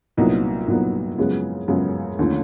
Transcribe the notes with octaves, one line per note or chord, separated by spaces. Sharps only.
C2 A#2 F#3 B3 D#4
C2 A#2 F#3 B3 D#4
F#2 C#3 F3 G#3 B3
F#2 C#3 F3 G#3 B3
D#2 D3 F3 A3 C#4